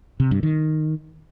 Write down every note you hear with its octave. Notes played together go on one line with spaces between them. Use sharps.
C3
G2
D#3